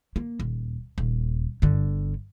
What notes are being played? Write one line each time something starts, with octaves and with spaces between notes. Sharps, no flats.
A#3
D#1
D#1
G1 D3